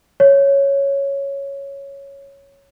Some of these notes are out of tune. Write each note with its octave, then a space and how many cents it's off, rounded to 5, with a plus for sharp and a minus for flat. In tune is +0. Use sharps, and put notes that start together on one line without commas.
C#5 +0